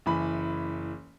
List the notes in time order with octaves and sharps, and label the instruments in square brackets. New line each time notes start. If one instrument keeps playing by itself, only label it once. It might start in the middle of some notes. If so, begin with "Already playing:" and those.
[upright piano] F#1 E3 B5